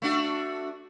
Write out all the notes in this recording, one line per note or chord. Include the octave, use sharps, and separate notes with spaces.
A3 D4 F#4